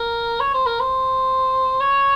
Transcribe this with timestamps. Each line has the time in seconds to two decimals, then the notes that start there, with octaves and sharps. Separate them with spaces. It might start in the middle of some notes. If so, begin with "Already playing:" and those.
Already playing: A#4
0.40 C#5
0.54 C5
0.66 A#4
0.79 C5
1.80 C#5